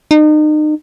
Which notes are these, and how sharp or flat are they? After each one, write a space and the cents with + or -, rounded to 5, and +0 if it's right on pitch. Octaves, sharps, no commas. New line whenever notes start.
D#4 -35